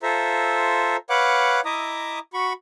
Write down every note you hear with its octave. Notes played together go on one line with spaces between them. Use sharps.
F4 A4 C5 E5 A#5
B4 C#5 F5 F#5 D6 F#6
E4 D#5 E5 A#5 D6 D#6
F#4 B5 C#6